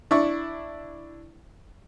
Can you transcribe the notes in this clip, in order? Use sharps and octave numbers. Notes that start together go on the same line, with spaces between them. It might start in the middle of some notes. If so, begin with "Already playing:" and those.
D4 E4 C#6